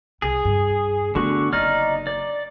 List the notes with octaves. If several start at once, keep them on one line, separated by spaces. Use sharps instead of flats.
C2 G#4
G2
D3 A3 B3 F#4
F#1 D#4 D5 F6
D5